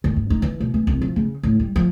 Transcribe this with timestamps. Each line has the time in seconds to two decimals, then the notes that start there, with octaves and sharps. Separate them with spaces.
0.04 D#3
0.16 G2
0.30 D#4
0.42 E3
0.60 B2
0.74 E3
0.87 C2
1.01 F3
1.16 C#3
1.43 A2
1.60 G3
1.76 F3